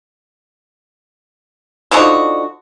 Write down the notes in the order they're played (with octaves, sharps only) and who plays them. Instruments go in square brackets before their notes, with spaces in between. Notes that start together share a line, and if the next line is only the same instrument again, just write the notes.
[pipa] D3 F3 D#4 F#4